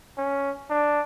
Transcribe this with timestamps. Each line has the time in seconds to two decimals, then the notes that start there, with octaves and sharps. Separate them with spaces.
0.17 C#4
0.70 D4